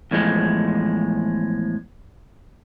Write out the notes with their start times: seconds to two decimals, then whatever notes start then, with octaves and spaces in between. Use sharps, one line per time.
0.11 E2 A2 F3 G#3